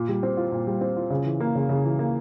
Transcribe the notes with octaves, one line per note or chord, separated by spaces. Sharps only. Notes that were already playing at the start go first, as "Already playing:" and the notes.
Already playing: A#2
G3
C4
F4
A#2
G3
C4
F4
C#3
E3
A#3
C#3
C#3
E3
A#3